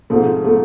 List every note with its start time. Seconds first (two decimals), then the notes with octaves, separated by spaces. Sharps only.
0.10 G#2 F3 A3 C4
0.44 F3 A3 C4